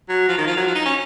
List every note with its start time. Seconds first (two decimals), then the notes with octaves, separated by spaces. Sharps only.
0.09 F#3
0.29 F3
0.38 D#3
0.47 F3
0.57 F#3
0.67 F3
0.75 D#4
0.86 C#4